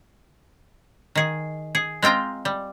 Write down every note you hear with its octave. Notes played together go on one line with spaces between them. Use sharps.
D#3 G#4
G#4
G#3 C4 F4 G5 A#5
G3